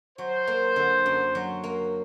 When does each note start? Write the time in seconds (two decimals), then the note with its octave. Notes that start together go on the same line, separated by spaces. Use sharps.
0.18 F#3 C5
0.47 A#3
0.76 D3
1.06 F#2
1.35 F#3
1.64 A#3